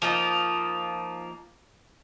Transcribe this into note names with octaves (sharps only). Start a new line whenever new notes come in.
F3 A#3 D#4